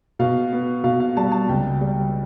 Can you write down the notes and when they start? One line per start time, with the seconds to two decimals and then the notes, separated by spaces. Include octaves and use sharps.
0.19 B2 F5
0.52 B3
0.84 B2 F5
1.00 F5
1.17 G3 A5
1.32 A5
1.49 C#2 G5
1.81 G3